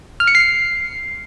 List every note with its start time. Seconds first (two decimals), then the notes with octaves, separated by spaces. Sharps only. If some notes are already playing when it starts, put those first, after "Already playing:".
0.20 F6
0.27 C#7
0.35 C7